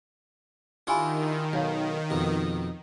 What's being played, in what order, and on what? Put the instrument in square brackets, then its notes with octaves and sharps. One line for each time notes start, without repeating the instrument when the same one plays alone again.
[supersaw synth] D#3 [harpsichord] D4 E4 F4 [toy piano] G4 G#5 B5
[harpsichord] B1 [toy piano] D#4 C#5 F5
[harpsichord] F2 B2